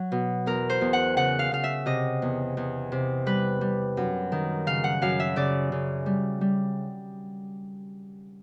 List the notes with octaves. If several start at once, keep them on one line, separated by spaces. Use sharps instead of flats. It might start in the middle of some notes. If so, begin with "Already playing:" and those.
Already playing: F#3
B2
E2 A#4
C5
E2
F#5
C#3 F#5
F5
C#3 F5
E5
C3 D#5
E2
E2
C3
G3 B4
G3
F#2
D#3
C#3 F5
F#5
F#2 F5
E5
C#3 D5
C#3
G3
G3